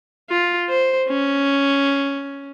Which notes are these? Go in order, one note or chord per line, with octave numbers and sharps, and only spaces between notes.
F4
C5
C#4